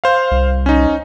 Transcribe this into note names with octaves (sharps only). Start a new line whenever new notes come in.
C5 F5
C2
C#4 D#4